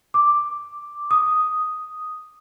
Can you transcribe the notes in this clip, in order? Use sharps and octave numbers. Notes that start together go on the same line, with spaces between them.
D6
D#6